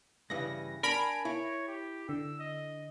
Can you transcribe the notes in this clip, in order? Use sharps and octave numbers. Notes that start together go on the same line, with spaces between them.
G2 C#3 E3 A#6
D4 A#4 G#5 B5 D7
E4 C#5
G4
D3 E6
D#5